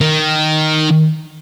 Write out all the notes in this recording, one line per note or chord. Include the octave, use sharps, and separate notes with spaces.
D#3